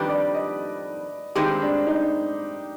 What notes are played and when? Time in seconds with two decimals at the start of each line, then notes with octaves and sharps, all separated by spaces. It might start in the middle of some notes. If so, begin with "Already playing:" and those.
Already playing: F2 D#3 G3 D4 G4 B4
0.09 D5
0.34 D#5
1.35 G2 D#3 G#3 C4 G4
1.62 D4
1.87 D#4